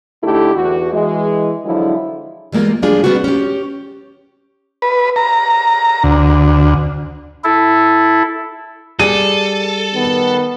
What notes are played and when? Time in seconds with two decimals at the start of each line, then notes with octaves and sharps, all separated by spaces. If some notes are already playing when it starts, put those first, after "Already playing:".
0.24 D3 A3 D#4 E4 G4 A4
0.55 E2 F#4
0.93 E3 G#3
1.66 D3 F3 F#3 G#3 E4
2.52 E3 G3 G#3 A#3 F4
2.82 A2 F3 G3 D4 F4 G#4
3.04 G3 B3 C4 D4 F#4
3.24 C#4 G4
4.82 B4
5.16 A#5
6.03 D2
7.44 E4 A4
9.00 G3 G#4 A4 D#7
9.94 D#3 B3